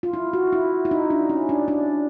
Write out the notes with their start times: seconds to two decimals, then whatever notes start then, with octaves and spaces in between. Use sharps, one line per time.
0.03 F4
0.13 E4
0.33 F#4
0.52 E4
0.85 E4
0.91 D#4
1.10 D4
1.30 C#4
1.49 D4
1.68 D4